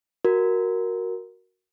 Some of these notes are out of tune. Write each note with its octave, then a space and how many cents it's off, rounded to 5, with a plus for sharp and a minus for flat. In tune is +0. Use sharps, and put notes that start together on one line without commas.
F#4 +0 A#4 +0